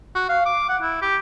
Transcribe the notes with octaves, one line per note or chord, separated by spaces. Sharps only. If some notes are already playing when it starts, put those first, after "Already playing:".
F#4
F5
D6
F#5
E4
G4